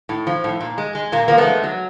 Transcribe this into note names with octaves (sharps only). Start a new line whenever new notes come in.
A2
F3
A2
A#2
G#3
G#3
A#2 A#3
F3 A#3
A3 B3
G#3
F#3